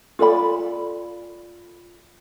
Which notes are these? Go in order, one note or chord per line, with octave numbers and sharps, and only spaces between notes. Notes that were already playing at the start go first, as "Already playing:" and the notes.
F4 A4 D5 B5